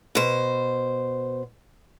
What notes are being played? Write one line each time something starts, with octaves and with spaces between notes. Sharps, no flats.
B2 C5